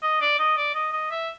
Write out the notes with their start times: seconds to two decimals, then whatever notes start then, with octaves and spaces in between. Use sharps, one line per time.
0.03 D#5
0.21 D5
0.39 D#5
0.57 D5
0.75 D#5
0.93 D#5
1.11 E5